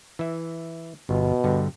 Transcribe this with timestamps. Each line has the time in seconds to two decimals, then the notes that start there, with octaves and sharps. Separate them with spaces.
0.19 E3 E5
1.09 G1 B2
1.44 G2 D3